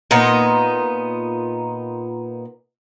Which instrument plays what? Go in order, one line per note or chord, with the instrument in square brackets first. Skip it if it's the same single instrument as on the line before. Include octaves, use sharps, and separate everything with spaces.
[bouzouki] A#2 B3 D#4